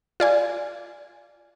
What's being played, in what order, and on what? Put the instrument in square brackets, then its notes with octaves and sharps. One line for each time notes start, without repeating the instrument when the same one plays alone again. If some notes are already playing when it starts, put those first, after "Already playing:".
[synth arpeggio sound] F4 D5 G#5